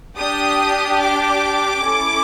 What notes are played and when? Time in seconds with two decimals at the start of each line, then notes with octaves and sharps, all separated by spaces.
0.17 D4 G4 D#6
1.00 D6
1.83 C#4 E4 A4